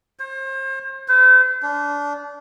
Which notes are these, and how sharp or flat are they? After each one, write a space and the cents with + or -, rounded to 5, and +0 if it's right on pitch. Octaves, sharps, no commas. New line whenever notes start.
C5 +35
C5 -45
D4 -25